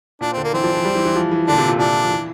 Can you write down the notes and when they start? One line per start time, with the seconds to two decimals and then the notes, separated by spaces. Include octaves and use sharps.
0.21 A#2 D4
0.33 D3 C4
0.44 A#3
0.53 E3 C4
0.63 F3
0.74 E3
0.85 G3
0.95 E3
1.05 E3
1.16 F3
1.31 E3
1.47 D3 D4
1.53 A#2
1.58 C3
1.68 A#2
1.79 A#2 D4
2.04 F3
2.10 E3